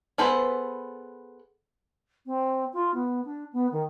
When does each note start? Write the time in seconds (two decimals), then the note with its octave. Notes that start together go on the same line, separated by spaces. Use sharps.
0.18 B3 G#4 A4 B4 C5
2.26 C4
2.73 F4
2.94 B3
3.25 D4
3.52 B3
3.71 D#3